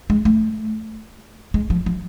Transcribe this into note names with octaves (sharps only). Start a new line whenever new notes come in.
G#3
A3
G#3
F3
F3